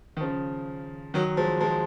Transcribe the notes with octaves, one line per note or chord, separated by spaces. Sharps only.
D#3
C#3 F3
D#3 F#3
F3 G#3
F3 G#3